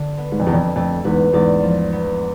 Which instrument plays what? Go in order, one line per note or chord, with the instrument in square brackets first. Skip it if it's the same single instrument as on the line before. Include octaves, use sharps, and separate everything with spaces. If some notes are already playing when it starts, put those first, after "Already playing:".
Already playing: [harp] D3
B3
[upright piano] G#2
F2
[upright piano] E2 [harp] D4
[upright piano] F2
[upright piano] F2 [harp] A3
[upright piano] E2 G#2 [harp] B4
[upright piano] E2 G#2 [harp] D5
[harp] F3
B3